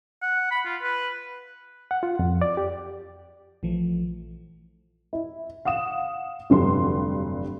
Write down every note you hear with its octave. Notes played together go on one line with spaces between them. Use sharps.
F#5
B5
F4
B4
F#5
F4
F2
D5
G4
A#1 E3 F3 A3
E4
F5 F#5 D#6 E7
F1 G2 D3 F#3 C6